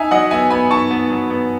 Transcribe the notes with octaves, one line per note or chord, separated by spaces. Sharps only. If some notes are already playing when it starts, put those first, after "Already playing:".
Already playing: D#4 E5 G#5
F#3 D#5 F#5
B3 E5 G#5
B3 G#5 B5
D#4 A5 C#6
B3
F#3
B3